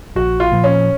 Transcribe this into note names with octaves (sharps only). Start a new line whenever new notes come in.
A#1 F#4
F4
A#2 F3
C#4